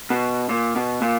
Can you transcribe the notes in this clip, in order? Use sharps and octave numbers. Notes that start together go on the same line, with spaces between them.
B2
A#2
B2
A#2